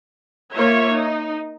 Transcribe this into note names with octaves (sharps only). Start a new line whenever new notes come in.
A#3 F4 C#5 E5
D#4